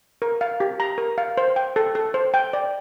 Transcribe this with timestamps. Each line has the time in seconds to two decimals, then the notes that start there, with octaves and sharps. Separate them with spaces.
0.22 A#4
0.41 F5
0.60 G4
0.80 A#5
0.98 A#4
1.18 F5
1.37 C5
1.56 G5
1.76 A4
1.95 A4
2.14 C5
2.34 G5
2.53 D5